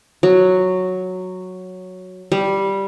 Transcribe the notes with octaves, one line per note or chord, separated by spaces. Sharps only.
F#3
G3